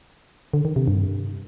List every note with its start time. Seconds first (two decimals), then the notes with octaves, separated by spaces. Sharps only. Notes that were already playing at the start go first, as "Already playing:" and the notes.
0.54 D3
0.65 D#3
0.76 C3
0.88 G2